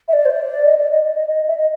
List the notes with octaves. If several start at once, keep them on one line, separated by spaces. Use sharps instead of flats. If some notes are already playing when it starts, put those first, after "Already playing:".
E5
D5
C5
D5
D#5
D5
D#5
D#5
D#5
D#5
E5
D#5